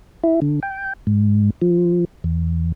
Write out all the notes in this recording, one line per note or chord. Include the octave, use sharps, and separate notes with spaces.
E4
D3
G5
G#2
F3
E2